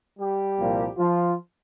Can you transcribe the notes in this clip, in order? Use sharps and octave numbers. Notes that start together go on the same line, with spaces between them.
G3 G4
C2 A#2 F3 A#3
F3 F4